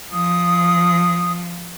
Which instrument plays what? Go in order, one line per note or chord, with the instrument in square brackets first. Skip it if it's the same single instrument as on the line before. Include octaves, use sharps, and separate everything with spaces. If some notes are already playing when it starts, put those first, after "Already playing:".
[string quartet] F3 [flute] D#6